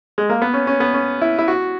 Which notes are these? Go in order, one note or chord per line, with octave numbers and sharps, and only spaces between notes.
G#3
A#3
B3
C#4
C#4
B3
C#4
E4
E4
F#4